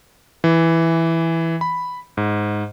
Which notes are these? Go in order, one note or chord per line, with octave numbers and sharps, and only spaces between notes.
E3
B5
G#2